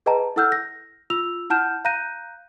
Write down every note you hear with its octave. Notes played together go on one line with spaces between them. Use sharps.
G#4 B4 D#5 G5 A5 A#5
E4 A4 F#5 E6 F6 G6
A#6
F4 E6 F7
E4 F#5 A5 F6 G6 E7
F5 A#5 F#6 G6 A#6 D#7